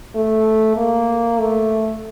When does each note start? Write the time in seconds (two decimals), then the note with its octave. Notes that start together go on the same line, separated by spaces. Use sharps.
0.15 A3
0.76 A#3
1.39 A3